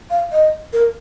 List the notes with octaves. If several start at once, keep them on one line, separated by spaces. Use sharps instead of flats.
F5
D#5
A#4